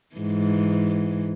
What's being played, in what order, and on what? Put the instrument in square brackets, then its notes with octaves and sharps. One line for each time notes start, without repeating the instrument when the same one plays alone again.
[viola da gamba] G#2 E3